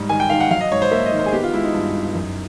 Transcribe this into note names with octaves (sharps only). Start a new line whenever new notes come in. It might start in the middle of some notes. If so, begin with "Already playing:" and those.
Already playing: G#2 G3
D#3 G#5
G5
D#3 F5
F#5
F#3 F5
D#5
G#2 C#5
C5
A#3 E5
D#5
D#3
C5
G#4
B3 G4
F4
G#3 E4
D#4
G2
G2
F#2